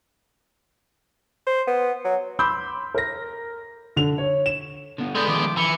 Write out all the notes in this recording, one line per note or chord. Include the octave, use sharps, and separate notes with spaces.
C5
B3
F#3
B5 C6 D6 E6 G6
A#4 A#6
D3 F7
C#5
E7
D3 B3
G#3 B3 A4 D5 G6
D#3 F3 D6
E3 C#7